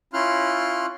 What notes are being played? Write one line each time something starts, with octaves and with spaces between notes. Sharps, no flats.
C#4 E4 F4 C6 F6 F#6